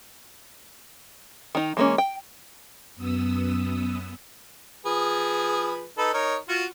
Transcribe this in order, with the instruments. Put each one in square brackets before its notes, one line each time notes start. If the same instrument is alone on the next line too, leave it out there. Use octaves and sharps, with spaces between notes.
[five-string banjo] D#3 D#4
E3 G#3 A#3 B3 C#4
G5
[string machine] F#2 B3 D#6 E6
[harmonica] F3 G#4 B4
D#4 A4 B4
D#4 A#4 C#5
F4 F#4